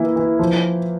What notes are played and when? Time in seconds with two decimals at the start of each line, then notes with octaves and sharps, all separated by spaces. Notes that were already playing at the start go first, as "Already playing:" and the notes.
Already playing: E3 A#3 E4
0.16 E3
0.39 F3